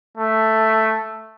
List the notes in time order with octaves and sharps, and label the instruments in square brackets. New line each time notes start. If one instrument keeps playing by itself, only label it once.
[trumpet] A3